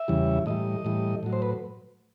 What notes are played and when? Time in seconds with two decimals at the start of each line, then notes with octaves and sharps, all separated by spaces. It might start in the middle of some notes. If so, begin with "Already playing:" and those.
Already playing: E5
0.08 E2 C#3 E3 G3
0.46 A2 E3 G3 D#5
0.85 A2 E3 G3
1.23 A2 F#3
1.33 C5
1.42 B4